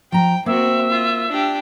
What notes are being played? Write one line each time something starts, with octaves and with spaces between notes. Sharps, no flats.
F3 G5 A#5
A#3 C4 F#4 E5
F4
D4 G4